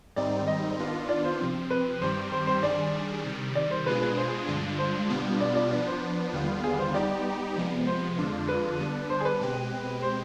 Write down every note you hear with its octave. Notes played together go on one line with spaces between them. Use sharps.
G#2 D#3 G3 C4 D#4 D5
D#5
D#3 B3 D4 F4
D5
C5
C3 F3 C4
B4
G2 D#3 G3 C4 G4 C5
C5
C5
D#3 G3 D4 G#4 D5
C3 D#3 G3
D5
C5
B2 G#3 D4 F4 G#4 B4
B4
C5
G2 D3 G#3 D4 F4
C5
B2 G3 B3 D4 F4
D5
D5
F3 B3 D4 D5
C5
D#2 D3 G3 B3 F4
G#4
C5
G3 B3 D#4 G4 D5
C3 F3 G#3 B3
C5
F2 D3 G#3 D4 F4
B4
D3 G3 B3 D4
C5
G#4
B4
B2 G#3 C4 G4
C5